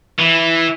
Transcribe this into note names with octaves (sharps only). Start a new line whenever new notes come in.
E3